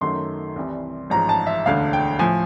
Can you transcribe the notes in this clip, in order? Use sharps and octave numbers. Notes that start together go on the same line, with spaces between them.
F#2 D#3 F#3 A3 C6
C2 C3 E3 G3
A1 G#2 F3 G#3 A#5
A5
E5
E1 D2 D3 F5
G5
A2 F3 G#5